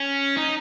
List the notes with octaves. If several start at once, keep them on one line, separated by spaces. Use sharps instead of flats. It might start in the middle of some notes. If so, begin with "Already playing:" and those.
Already playing: C#4
D#4